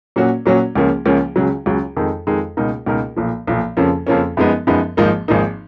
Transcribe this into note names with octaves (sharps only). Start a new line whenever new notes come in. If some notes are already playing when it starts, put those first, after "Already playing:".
A#2 F#3 C#4 F#4
A#2 F#3 C#4 F#4
C#2 C#3 F3 A#3 C#4
C#2 C#3 F3 A#3 C#4
C#2 C#3 F#3
C#2 C#3 F#3
F2 D#3 G#3 D#4
F2 D#3 G#3 D#4
C#2 B2 A#3 D#4 A#4
C#2 B2 A#3 D#4 A#4
B1 A#2 F3
B1 A#2 F3
F2 C#3 F3 A#3 C#4
F2 C#3 F3 A#3 C#4
F#2 F3 G#3 B3 D#4
F#2 F3 G#3 B3 D#4
G#1 G#2 F3 A#3 D#4
G#1 G#2 F3 A#3 D#4